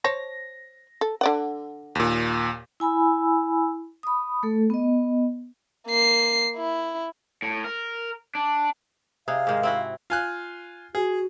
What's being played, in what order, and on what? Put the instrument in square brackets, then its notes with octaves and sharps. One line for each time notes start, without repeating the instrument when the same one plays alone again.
[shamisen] C5 C#5 A5 [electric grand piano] A#6
[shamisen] A4
D3 D5 F#5
[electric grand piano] D#2 A#2
[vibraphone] E4 G#5 B5 E6
B5 D#6
A3 A4
B3 D#5
[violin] A#3 C7
E4
[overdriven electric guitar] A2
A#4
D4
[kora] C3 D#4 G#4 [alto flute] F5
[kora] G#2 D#3 G#3
C4 E4 F#4
[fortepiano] F4 G#5 F#6
[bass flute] F#4 [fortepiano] G#4